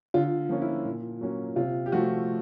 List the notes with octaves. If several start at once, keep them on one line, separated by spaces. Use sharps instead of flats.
D3 F4
F3 A#3 C#4
E4
A#2
F#3 A#3 C#4
C3 F4
G4
F3 A3 F#4